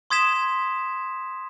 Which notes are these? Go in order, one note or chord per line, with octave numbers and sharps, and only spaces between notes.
C6 D#6 G#6 B6 E7